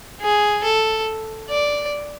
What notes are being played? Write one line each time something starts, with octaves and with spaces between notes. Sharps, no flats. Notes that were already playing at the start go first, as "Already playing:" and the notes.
G#4
A4
D5